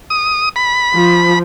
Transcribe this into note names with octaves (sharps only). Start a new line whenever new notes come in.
D#6
B5
F3